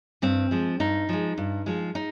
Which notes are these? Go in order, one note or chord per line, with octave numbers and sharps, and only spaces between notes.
G2 C4
F3 G#3
G2 D#4
F3 G#3
G2
F3 G#3
D#4